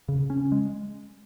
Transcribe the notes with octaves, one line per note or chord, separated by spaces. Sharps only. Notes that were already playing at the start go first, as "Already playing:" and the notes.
C#3
C#4
G#3